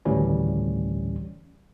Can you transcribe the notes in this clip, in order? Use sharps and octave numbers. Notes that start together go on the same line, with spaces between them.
G#1 D2 A2 E3 G3 C#4